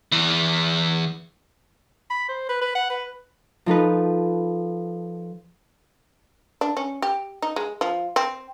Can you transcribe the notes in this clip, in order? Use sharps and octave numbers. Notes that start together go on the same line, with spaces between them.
E2 E3
B5
C5
B4
B4
F#5
B4
F3 D#4 A4 B4
D4
C#4
G4
D#4
G#3
F3
C4